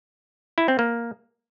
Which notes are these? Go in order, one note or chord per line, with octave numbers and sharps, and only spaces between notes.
E4
C4
A#3